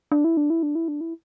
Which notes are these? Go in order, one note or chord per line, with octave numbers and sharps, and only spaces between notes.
D4
E4
D4
E4
D4
E4
D4
E4